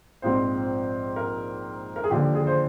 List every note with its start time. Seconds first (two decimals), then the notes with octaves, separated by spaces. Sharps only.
0.22 A#1 G#2 F3 C4 C5
1.16 A#4
1.96 A#4
2.04 G#4
2.10 D#2 D3 F3 G4
2.35 G#4
2.47 C5